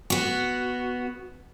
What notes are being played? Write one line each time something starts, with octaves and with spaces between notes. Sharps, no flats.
B3 F#4